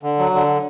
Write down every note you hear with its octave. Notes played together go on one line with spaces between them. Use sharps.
D3
F#3
D3